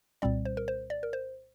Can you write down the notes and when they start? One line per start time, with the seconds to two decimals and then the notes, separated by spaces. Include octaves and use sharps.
0.22 C2 A#2 G3 C4 D5
0.45 C5
0.57 A#4
0.68 C5
0.90 D5
1.03 A#4
1.13 C5